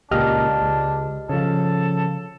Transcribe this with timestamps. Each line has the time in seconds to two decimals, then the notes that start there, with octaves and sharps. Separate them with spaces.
0.11 C#2 A#2 D4 G4 D#5 F6
0.62 C#2
1.29 C#3 F3 A4